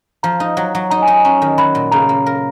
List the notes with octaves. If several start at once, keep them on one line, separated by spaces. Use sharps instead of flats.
F3 A#5
D#4
F#3
F#3
D#4 A#5
G#5
D#4
G#5
C#4 A#5
D#3
F#3 B5
A#2
C#3 A#5
A#3
A#4